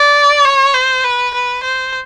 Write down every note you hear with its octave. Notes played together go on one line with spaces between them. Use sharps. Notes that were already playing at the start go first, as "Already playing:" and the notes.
Already playing: D5
C#5
C5
B4
B4
C5